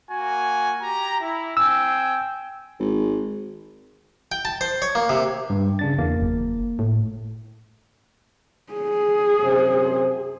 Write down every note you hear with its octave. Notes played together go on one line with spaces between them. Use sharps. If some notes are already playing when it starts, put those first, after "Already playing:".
A#3 F#4 G#5
G4 A#5
E4
C4 G5 G#5 E6
G#1
G5
A5
C5
C#5
A#3
C3
G2
C#3 D4 A6
E2 A#3
F#1
A2
G#4
F#2 C3 C5